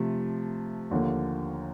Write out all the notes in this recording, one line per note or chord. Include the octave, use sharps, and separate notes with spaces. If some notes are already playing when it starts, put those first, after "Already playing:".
Already playing: C3 F3 A3
D#2 D3 F3 A#3